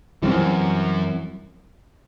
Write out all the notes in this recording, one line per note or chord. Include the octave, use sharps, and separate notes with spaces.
F#2 E3 G3 C4